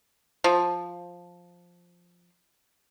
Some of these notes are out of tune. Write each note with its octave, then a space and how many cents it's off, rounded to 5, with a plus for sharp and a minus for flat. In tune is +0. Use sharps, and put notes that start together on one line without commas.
F3 +5